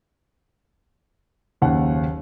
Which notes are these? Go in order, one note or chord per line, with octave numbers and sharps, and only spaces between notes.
F#1 D#2 F#5